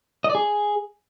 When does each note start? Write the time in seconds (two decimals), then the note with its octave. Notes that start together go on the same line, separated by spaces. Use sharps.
0.24 D#5
0.30 D5
0.35 G#4